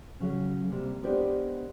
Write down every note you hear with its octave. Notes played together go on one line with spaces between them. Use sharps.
C#3 F#3 C#4
C3 G3 A#3
G#3 B3 D4 G4 A#4 C5